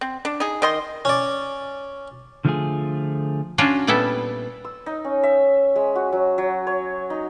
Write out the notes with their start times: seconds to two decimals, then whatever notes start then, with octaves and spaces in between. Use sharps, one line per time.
0.01 C4
0.25 D4
0.40 D#4 G#4
0.62 D#3 D#5 C6
1.05 C#4 D5
2.45 D3 F3 A3 B3 F4 G#4
3.58 C#4 D4 F4 F#4
3.87 A#2 G3 B3 E4 A4
4.65 E6
4.86 D#4
5.05 C#4
5.23 E5
5.76 G#3
5.96 F#4
6.12 F#3
6.38 F#3
6.67 C#5
7.10 D#4